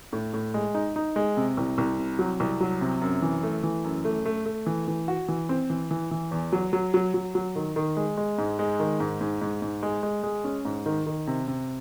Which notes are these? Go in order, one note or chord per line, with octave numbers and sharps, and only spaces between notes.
A2
A2
G#3
D#4
D#4
G#3
C3
C2
C2
C3
F#3
C2
F#3
C3
F#2
E3
A3
E3
F#2
A3
A3
A3
E3
E3
F#4
E3
C4
E3
E3
E3
E2
F#3
F#3
F#3
F#3
F#3
D#3
D#3
G#3
G#3
G#2
G#3
D#3
G#2
G#2
G#2
G#2
G#3
G#3
G#3
C#4
G#2
D#3
D#3
C3
C3